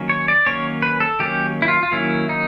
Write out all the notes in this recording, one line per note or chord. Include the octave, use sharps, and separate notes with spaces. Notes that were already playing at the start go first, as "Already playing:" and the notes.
Already playing: D#3 F#3 A#3 C#4
C#5
D5
D#3 F#3 A#3 C#4 C#5
B4
A4
D#3 F#3 A#3 C#4 G4
E4
F4
F4
D#3 F#3 A#3 C#4 E4
D#4